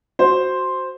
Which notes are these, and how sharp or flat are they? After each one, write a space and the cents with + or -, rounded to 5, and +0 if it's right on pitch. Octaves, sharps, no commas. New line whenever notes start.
F#4 +0 C5 +0